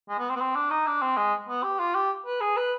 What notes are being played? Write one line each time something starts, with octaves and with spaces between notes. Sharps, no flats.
G#3
B3
C4
B3
C4
D4
D#4
D4
C4
G#3
B3
G4
F4
G4
B4
G#4
B4